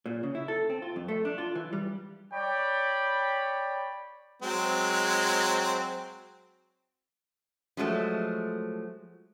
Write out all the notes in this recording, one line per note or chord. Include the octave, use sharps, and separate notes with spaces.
A#2
C#3
E4
A4
C4
F4
F2
A3
D4
F4
E3
G3
C#5 D5 G5 B5
F#3 G#3 C4
F3 F#3 G#3 A3